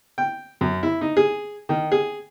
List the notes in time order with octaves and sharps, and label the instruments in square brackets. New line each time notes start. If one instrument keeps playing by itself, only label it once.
[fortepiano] G5
F#2
E4
D#4
G#4
D#3
G#4